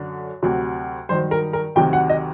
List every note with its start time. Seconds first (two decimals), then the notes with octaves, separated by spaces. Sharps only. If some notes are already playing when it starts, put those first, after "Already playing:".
Already playing: F#2 D3 F#3
0.42 D2 C3 F#3
1.09 G2 D#3 F#3 C5
1.31 A#4
1.53 A#4
1.76 D2 C3 D#3 F#3 G5
1.93 F#5
2.09 D#5